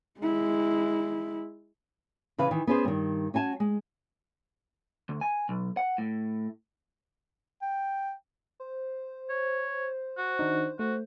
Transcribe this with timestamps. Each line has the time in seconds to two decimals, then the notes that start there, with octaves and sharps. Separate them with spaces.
0.20 G#3 E4
2.38 C#3 E3 B4 F5
2.51 D#3 E3
2.67 B3 C#4 G#4 C5
2.85 G2 D#3
3.34 C#4 F#4 G#5 A5
3.60 G#3
5.09 D2
5.21 G#5
5.49 B1
5.77 F#5
5.98 A2
7.62 G5
8.60 C5
9.29 C#5
10.18 F#4
10.39 D#3 D4 D#4
10.79 A3 F#4